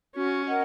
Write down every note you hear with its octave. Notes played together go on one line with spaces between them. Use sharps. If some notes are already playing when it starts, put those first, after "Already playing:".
C#4 F#4
A#4 D#5 F#5